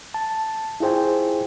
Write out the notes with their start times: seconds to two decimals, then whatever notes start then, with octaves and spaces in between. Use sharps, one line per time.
0.14 A5
0.80 E4 F4 G#4 C5 G5